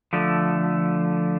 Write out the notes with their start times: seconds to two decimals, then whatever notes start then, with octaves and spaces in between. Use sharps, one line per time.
0.13 D3 F3 A3